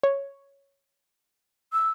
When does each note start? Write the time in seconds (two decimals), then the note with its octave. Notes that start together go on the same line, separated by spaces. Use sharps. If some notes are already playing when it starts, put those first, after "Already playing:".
0.03 C#5
1.73 E6